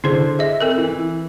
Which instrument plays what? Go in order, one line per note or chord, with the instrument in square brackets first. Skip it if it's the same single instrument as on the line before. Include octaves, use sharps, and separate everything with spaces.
[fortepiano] D3 [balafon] E4 G#4 C5
[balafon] G#4 D#5 [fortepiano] E5
[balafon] C4 A4 A#4
[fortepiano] E3